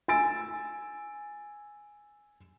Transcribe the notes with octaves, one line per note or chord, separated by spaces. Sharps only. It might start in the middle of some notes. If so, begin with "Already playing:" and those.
G#5 E6 A6 D7